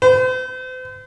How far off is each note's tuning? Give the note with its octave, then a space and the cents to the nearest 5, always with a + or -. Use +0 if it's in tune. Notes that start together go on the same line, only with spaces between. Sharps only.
C5 -40